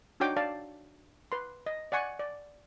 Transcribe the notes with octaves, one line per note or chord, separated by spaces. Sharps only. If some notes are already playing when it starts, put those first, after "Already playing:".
D4 D#4 F#4 C#5 G5 D6
D5 F5 A5
B4 C6
D#5
D5 F#5 G#5 C#6
D5